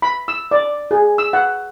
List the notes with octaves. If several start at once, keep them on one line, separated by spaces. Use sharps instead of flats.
B5
E6
D5
G#4
E6
F#5